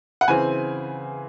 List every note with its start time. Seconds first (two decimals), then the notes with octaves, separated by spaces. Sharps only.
0.21 F#5
0.28 C#3 E3 C4 G#5